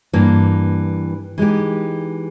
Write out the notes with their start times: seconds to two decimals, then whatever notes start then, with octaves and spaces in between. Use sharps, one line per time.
0.13 G2 E3 A#3
1.38 E3 G#3 D#4 G4